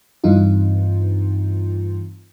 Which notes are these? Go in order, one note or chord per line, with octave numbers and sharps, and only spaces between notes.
G2 E3 C4 D#4 F4